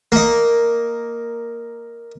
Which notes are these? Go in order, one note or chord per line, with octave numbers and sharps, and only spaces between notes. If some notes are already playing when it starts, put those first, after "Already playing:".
A#3 D#4